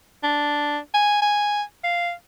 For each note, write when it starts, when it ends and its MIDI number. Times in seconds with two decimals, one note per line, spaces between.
0.23 0.78 62
0.94 1.21 80
1.22 1.62 80
1.84 2.11 77